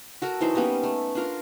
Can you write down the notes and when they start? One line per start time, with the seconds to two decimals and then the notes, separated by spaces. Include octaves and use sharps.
0.22 F#4 A4 A#4
0.41 E3 F#3 D#4 C5
0.55 G3 A#3 B3 C#4
0.84 A3
1.15 D4 F4 A#4